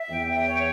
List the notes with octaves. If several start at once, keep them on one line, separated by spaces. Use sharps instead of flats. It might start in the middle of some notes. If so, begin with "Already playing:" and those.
Already playing: E5
E2 G5
G5
C#5